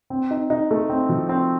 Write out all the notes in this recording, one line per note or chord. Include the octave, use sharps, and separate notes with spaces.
C4
D#4
D#4
A3
C4
F3
C4